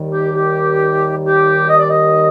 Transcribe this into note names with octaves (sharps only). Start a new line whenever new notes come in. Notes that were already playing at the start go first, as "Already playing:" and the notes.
Already playing: D#2 D#3 G3
G4
G4
G4
D#5
D5
D#5